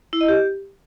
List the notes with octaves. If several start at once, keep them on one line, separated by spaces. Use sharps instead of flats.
E4
D#5
G4